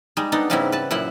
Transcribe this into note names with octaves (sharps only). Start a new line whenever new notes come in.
G3 G#3 D#4
B3 D4 D#4 A4
G#2 C#3 G3 B3 C4 E4
B4 A5
F#2 A#2 E4 C5 F#5